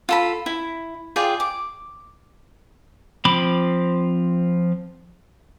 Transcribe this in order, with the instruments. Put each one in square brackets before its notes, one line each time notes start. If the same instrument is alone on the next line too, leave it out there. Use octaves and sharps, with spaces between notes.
[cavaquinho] F4 A4 B5
E4
F4 G#4 D5 G5
D6
[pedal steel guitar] F3 C4 B5 D6